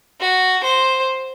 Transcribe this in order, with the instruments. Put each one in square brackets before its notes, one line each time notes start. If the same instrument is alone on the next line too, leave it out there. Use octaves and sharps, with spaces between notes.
[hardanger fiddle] F#4
C5